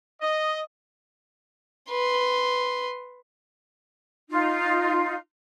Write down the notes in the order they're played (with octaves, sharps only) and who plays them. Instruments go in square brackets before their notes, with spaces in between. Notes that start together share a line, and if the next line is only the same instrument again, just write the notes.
[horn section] D#5
[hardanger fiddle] B4 C6
[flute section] D#4 F4